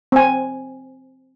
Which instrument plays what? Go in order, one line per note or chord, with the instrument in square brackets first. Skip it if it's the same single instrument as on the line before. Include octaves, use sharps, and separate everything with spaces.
[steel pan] C4 G#5